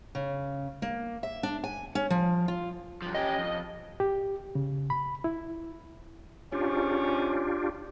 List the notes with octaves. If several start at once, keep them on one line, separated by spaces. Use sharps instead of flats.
C#3
A#3
E5
D4
G#5
C#4
F3
F4
G2 F3
C#4 G4 D#5
F2
G4
C#3
B5
E4
G#2 C#4 D4 F4 G4